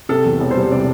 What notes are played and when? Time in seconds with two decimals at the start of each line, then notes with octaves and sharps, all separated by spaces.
0.09 C3 A4
0.25 E2
0.40 E1
0.51 C5
0.57 G3
0.71 C3 D5